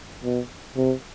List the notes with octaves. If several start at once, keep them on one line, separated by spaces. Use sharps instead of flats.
B2
C3